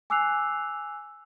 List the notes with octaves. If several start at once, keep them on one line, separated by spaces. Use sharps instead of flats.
G#5 D6 E6 F#6 C7 F7